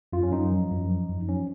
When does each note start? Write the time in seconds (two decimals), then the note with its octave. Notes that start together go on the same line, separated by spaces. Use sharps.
0.13 F#2 F4
0.23 C#4
0.32 F#2 D#4
0.52 F3
0.71 F#2
0.90 F3
1.09 F#2
1.29 F3 C#4